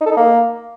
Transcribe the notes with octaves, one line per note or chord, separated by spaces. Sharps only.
D#4
A4
D#4
A#3